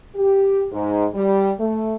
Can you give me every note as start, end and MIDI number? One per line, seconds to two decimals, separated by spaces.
0.16 0.65 67
0.72 1.05 44
1.14 1.52 55
1.59 1.96 57